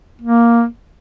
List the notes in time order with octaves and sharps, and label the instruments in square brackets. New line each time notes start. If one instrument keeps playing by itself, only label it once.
[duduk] A#3